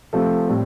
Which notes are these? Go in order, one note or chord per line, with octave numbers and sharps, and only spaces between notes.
C3 F3 A3 C4 F4 A4
A2 G3 C4